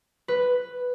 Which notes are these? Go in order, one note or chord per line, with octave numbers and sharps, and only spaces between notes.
B4